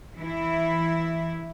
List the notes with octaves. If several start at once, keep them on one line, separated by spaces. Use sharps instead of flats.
E3 E4